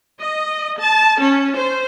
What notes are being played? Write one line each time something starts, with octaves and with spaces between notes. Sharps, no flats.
D#5
A5
C#4
C5